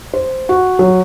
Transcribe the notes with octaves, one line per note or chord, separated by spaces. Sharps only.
C5
F#4
F#3